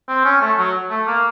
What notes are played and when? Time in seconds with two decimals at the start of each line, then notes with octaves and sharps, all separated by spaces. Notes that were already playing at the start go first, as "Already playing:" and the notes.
0.08 C4
0.25 C#4
0.41 A3
0.58 F#3
0.90 A3
1.07 A#3